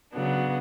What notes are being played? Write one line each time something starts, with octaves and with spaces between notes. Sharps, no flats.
C#3 F#3 B3 D4